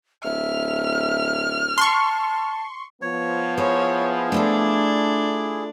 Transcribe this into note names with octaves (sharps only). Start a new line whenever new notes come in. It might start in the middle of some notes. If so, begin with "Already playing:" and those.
D1 E5 F6
A5 C6 C#6
F3 B3 C#5
E4 G#4 C5 C#5 E5
A3 D4 F4 A4 D5